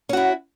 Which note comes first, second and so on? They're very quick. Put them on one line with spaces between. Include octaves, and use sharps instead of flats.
C#4 F#4 E4